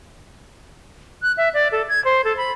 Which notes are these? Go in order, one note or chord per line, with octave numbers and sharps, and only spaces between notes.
F#6
E5
D5
A4
G#6
C5
A4
B5